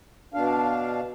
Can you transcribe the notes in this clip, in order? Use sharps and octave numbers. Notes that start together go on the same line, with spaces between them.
B2 D4 F5